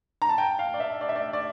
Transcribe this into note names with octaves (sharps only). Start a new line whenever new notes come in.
A#5
A5
G5
F5
D5
E5
D5
E5
D5
D5